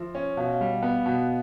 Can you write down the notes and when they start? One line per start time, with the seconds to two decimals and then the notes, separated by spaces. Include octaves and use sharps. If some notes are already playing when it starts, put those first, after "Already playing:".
Already playing: F3 E5
0.15 C#4
0.37 B2 F5
0.45 E5
0.53 F5
0.61 G3
0.82 B3
1.06 B2